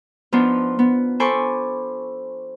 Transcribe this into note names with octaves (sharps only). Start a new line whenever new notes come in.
F3 B3 D4 D#4 F4
B3
A4 C5 G#5 B5 C#6 D6